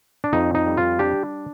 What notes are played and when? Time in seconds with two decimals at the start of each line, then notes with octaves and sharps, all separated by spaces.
0.24 D4
0.33 F2 D#4
0.55 D#4
0.66 G3
0.77 F4
0.99 D4 G4